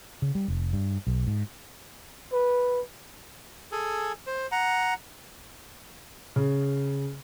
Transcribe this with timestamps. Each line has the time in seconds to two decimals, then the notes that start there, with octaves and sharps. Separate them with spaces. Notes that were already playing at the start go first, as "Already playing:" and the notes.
0.22 C#3
0.35 G3
0.48 F1
0.73 G2
1.07 B1
1.27 G#2
2.32 B4
3.72 G#4 A4 G#5
4.27 C5
4.52 F#5 A#5
6.36 C#3